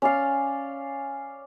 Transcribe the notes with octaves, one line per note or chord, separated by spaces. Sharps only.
C#4 D5 F5